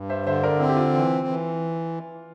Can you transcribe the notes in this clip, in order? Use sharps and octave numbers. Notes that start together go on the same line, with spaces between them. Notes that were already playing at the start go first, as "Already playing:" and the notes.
Already playing: G2
C5 E5
D3 C5 E5
A#4 D5
C4 E4
G4
F4
E3
E3